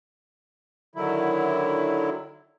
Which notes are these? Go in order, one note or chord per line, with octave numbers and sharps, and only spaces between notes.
D3 D#3 F#3 E4